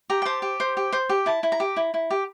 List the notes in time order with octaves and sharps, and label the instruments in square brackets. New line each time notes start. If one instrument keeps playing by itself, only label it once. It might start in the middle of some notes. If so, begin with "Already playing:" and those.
[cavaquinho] G4 A#5
G5
C5 A5
G4
C5
G4
C5
G4
E4 A5
E4
A#5
G4
E4
E4
G4